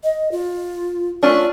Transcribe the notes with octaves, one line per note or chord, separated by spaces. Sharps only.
D#5
F4
A3 C#4 D4 F4